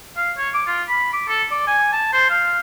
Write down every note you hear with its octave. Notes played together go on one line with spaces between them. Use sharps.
F5
C#5
D6
F4
B5
D6
A4
D5
G#5
A5
C5
F5